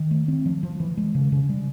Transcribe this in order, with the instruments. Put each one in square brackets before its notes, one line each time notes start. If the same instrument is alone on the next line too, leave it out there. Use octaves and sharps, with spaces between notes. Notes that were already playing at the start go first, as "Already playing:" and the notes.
Already playing: [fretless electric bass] D#3
A3
C4
F3
F3
E3
G#3
C#3
C#3
G3